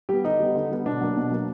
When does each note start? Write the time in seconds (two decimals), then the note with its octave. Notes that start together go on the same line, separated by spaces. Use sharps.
0.09 G3 B3 G4
0.24 D3 D#4
0.39 G3 B3
0.55 D3
0.71 G3 B3
0.86 B2 D4
1.01 F#3 A#3
1.17 B2
1.31 F#3 A#3